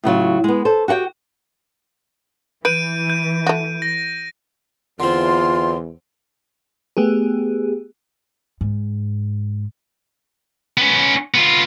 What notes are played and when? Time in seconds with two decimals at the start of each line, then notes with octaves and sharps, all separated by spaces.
0.04 A2 C#3 F#3 F4
0.44 G#3 B3
0.65 A4 C5
0.88 F#4 G4 F#5 G5
2.65 E3 B4 G6 D7 D#7
3.10 G6
3.47 A3 F#4
3.82 A#6
5.00 E2 D3 C4 F4 C6
6.97 A3 B3 G4 G#4
8.61 G#2
10.78 B3 C#4
11.34 B3 F4